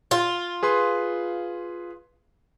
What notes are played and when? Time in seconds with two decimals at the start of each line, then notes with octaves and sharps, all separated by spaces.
0.11 F4
0.63 G#4 B4 C6